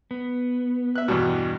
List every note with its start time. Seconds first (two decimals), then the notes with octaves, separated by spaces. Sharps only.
0.11 B3
0.96 E5 F#6
1.08 E2 G2 B2